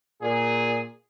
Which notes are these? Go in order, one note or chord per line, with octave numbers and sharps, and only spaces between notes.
A#2 G#4